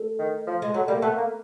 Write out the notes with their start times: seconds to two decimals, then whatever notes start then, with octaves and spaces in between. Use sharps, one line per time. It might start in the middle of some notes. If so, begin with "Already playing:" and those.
Already playing: A3
0.19 D#3
0.47 F3
0.62 G#3
0.74 F#3 A3
0.88 G3 A#3
1.02 A3 B3
1.16 A#3